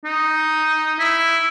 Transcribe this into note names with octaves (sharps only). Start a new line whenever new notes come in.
D#4
E4